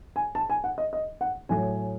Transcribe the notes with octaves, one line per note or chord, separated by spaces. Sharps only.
G#5
A5
G#5
F#5
D#5
D#5
F#5
A2 F#3 G#5